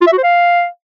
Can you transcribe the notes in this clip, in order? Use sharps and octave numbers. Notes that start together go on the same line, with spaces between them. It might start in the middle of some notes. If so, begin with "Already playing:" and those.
F4
E5
F#4
C5
F5